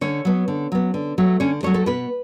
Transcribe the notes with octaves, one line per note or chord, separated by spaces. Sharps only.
D3 C#4 C#5
F#3 B3
D3
F#3 B3
D3
F#3 A3
D3 C#4 C#5
F#3 A3 C#4 C#5
A3 A4
B2 B3 B4